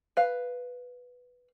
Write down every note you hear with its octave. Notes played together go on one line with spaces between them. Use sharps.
B4 F5